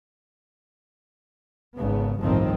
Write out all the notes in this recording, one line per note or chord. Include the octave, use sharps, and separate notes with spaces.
G#1 C#3 B3
G1 C2 A2 D#3 F3 C4